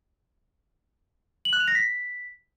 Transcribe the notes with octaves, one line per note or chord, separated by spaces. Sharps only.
F#7
F#6
F7
A#6
B6